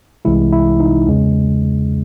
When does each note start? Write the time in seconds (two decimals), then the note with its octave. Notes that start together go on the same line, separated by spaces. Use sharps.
0.25 C2 C3 E3 G#3 E4
0.52 E4
0.80 D#4
1.07 E2 C#3 G#3